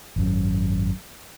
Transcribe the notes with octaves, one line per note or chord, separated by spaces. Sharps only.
G#1 F#2